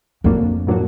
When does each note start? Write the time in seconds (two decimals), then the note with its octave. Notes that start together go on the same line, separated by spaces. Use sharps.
0.24 F2 A2 F#3 A#3 D4 F#4
0.67 A2 F#3 A#3 D4 F#4